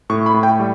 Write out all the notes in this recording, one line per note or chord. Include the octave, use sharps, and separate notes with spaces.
A2 C#6
B5
A2
G5
G3